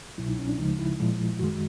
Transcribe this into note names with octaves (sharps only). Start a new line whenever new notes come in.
C2 B2 F#3 E4
D#4
C#4
D4
D2 C#3 F3 G#3 D#4
E4
A#2 F3 G#3
F#2 D#3 G#3 F#4